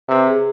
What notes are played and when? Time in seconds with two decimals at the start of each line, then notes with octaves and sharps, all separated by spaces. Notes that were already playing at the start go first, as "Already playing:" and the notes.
0.08 C3 B4
0.27 G#4